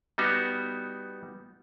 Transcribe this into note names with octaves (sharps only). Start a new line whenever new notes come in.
G3 B3 D#4 F#4